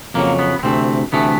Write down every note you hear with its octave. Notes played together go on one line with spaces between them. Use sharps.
F2 C#3 F#3 A#3
B3
B3
D2 C3 E3 A3 C4
D2 C3 E3 A3 B3